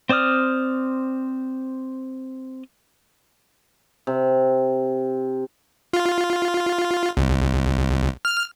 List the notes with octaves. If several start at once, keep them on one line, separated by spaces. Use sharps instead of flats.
C4 C5 D5 D#6 F6
C3
F4
C2
F6